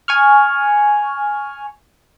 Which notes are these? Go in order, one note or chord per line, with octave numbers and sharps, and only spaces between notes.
G#5 C#6 F6